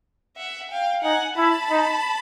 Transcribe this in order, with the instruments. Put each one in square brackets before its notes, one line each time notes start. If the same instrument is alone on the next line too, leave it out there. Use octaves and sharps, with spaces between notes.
[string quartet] E5 F#5
F5 G5
[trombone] D#4 [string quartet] F#5 G#5
[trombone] E4 [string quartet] A5 B5
[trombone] D#4